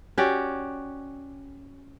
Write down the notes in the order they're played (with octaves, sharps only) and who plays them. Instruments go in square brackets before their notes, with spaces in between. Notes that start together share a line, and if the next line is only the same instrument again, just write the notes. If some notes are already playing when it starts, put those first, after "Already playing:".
[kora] C#4 F#4 G4 D5